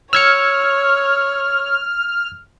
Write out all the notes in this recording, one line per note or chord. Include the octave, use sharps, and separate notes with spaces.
C#5 E6 F6 G#6 C#7